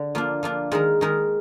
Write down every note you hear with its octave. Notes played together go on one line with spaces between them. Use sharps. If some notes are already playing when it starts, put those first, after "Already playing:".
Already playing: D3
F3 A#3 D4
F3 A#3 D4
D#3 G#3 D#4 A#4
D#3 G#3 D#4 A#4